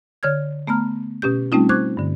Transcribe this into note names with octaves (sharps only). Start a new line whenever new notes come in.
D3 C#5 F6 G#6
A3 B3 A#5 F6
B2 C#4 G4 G6
G3 A3 C4 C#4 D#4 F4
C5 C#6 D6 F#6 G#6
G2 D3